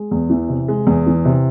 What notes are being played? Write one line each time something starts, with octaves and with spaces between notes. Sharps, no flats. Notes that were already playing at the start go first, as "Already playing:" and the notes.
Already playing: G#3
E2
E3
C3
G#3
E2
E3
C3